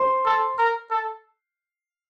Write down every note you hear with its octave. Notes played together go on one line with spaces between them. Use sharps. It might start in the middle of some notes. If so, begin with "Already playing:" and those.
Already playing: C5 C6
A4
A#4
A4